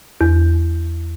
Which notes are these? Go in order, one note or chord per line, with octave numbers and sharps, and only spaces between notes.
E2